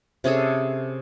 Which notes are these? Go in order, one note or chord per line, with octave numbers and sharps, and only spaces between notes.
C3 C#4 G#4 A4